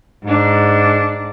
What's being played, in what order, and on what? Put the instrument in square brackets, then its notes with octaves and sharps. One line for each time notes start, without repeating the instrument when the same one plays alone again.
[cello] G#2 D4